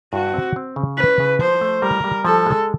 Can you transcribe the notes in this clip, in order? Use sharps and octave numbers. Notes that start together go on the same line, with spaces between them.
G2 F#4
C4
C4
C#3
C#4 B4
C#3
F3 C5
A3
G3 A#4
G3
F3 A4
G#3